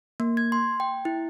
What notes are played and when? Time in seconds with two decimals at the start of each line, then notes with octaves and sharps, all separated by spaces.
0.20 A#3
0.37 G#6
0.52 C6
0.80 G5
1.05 E4